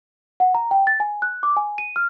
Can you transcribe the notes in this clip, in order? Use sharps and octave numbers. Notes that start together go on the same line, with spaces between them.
F#5
A#5
G5
A6
G#5
F#6
D6
G#5
D#7
F6